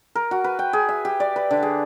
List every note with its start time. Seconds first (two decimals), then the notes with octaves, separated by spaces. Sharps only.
0.15 A#4
0.31 F#4
0.44 B4
0.59 G5
0.73 G#4
0.89 E5
1.05 G4
1.20 D5
1.36 B4
1.51 D3
1.63 G#4